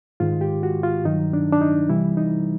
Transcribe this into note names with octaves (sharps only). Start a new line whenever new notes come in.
G#2 D#3 G#3 F4
G4
F#4
F4
G2 D#3 F#3 D#4
D4
D4
D#4
C3 E3 G3 E4
D#4